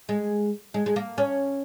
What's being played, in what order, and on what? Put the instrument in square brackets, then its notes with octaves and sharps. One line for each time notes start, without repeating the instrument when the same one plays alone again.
[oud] G#3
G#3
G#3
A#3
C#4